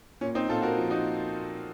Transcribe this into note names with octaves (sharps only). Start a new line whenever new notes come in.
A#2 C#4
C4 D#4
A#2 F4 A4
F#4 A#4
F3
D#4 F#4